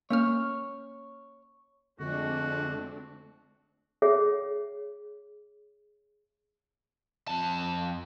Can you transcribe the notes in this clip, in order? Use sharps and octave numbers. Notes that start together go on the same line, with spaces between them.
A#3 C#4 C#5 F6
F2 D3 G#3 A3 C4 D4 F#4
G#4 C#5 E5 F#5
F2 A5